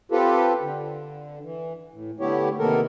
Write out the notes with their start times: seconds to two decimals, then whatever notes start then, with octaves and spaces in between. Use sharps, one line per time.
0.12 C4 F4 G4 A4 B4
0.62 D3
1.43 E3
1.93 A2
2.20 D3 A3 B3 E4 G4 C#5
2.59 C3 D#3 A#3 B3 A4 A#4